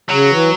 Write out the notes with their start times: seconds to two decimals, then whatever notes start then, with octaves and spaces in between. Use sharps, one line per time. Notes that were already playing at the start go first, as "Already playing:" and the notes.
0.10 C#3 F#3
0.30 E3